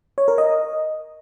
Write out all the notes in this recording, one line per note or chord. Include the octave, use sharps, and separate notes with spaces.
C#5
A#4
D#5